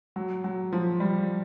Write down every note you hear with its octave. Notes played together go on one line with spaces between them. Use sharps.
F#3
F#3
F3
G3